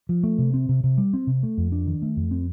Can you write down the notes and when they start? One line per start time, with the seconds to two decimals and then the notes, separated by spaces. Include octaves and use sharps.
0.09 F3
0.23 A3
0.38 C3
0.54 C4
0.69 C3
0.84 C3
0.98 G3
1.13 C4
1.27 C3
1.43 A3
1.57 F2
1.72 D4
1.87 D#3
2.02 A3
2.17 F2
2.31 C4